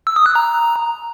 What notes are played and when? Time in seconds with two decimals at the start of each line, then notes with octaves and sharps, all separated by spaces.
0.07 E6
0.16 D#6
0.26 F#6
0.35 A#5